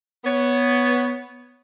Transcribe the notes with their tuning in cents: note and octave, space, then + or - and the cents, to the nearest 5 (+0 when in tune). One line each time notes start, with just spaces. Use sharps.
B3 +0 C#5 +10